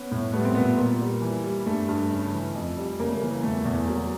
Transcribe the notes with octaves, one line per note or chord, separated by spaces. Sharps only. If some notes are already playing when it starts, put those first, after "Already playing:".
Already playing: B3 C#4
A2
G3 A3 B3
C4
A#2 A3 B3
A#2 A#3
G3
E3
G3
G2 A3
G2
C#3
E3
F2
G3
C#3 A#3
A3
A#3
E3
E2 A3
E2
F#3 A#3